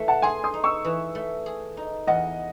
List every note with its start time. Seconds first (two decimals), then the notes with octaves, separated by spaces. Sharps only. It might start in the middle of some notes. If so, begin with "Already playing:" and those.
Already playing: E3 A3
0.08 F#5 A5
0.22 G#4 G#5 C6
0.44 C6 D#6
0.54 D#4
0.64 C#6 E6
0.85 E3
1.15 A3
1.46 G#4
1.77 D#4
2.07 E2 D#5 F#5